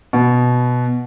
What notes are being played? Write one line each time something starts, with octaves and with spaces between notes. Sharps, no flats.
B2